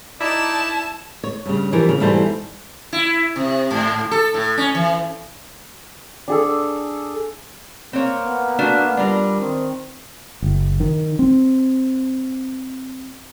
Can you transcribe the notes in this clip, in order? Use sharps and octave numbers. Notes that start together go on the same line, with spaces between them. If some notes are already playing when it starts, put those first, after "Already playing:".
D#4 E4 D5 A5 E7
C#5
G2 C#3
E3 F3 G4 A#4
C#3
G#2 B2 E3 G3 A4 C5
E4
C3
G#2
A4
A2
C#4
E3
D4 G#4 A4
A#3 C4 C#5
B3
A3 D4 F#4
G3 D4 F4 A#4
D#3 C4
F#1
D#3
C4